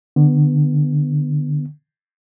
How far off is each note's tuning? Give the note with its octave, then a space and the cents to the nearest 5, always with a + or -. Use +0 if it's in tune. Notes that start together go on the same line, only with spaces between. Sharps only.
D3 +15 B3 +0